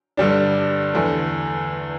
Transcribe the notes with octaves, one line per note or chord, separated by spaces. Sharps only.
G2 D3 G3 D4
E2 D3 A3